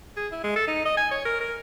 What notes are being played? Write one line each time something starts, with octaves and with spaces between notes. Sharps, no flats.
G#4
E4
G#3
A4
D#4
D#5
G#5
C#5
A#4
A#4